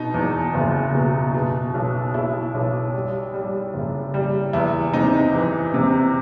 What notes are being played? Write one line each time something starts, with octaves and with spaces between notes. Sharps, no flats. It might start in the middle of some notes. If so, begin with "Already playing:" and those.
Already playing: B2 D#4
E2
F#1
B2
B2
B1
B2 E4
B1 E4
G3
G3
F#1
G3
E2 E4
C3 D#4
E3
C3